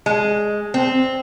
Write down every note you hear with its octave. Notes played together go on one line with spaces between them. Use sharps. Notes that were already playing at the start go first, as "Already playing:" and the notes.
G#3
C4